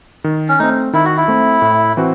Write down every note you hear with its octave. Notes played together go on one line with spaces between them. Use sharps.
D#3
C#4
A3 C4 D#4
D#3 E4
F#4
E4
A3 C4
A2
E3 C4 F#4